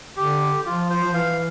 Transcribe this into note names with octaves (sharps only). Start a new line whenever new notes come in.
D3 G4
F3 F4
C5
F3
E3 F5